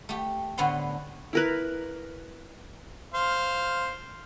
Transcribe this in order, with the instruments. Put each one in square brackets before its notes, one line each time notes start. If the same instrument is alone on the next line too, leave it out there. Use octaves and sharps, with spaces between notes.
[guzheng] A3 G4
A2 D3 B3 F#5 C6
[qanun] E4 A#4 B4
[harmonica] C5 F5